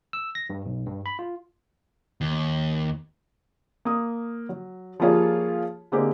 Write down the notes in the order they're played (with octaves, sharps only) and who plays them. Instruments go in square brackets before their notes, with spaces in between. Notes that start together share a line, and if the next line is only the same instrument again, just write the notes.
[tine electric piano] E6
A#6
G2
B1
G2
B5
F4
[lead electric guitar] D#2
[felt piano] A#3 D#6
F#3
F3 G3 A#3 F4 G#4 C#5
D3 G#3 A#3 C4 G4